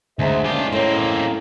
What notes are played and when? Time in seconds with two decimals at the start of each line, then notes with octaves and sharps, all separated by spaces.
0.19 D2 G#3 G#4 C5 E5 A#5
0.44 A#3 C#4 D4 F4 G4
0.72 A2 A#3 C4 C#4 A#5